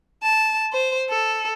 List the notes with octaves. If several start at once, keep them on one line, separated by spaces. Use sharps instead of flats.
A5
C5
A4